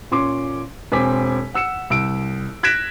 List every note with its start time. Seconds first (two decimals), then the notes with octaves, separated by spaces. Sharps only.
0.11 A#2 C#4 C6 D6
0.92 E1 C4 G#5 D6 B6
1.54 F#5 E6 C#7 E7
1.90 C2 E6 D7
2.63 F#6 G#6 A#6 B6 D7 E7